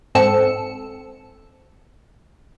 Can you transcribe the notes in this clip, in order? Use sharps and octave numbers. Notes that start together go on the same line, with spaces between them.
G#2 C4 A4 E6 C#7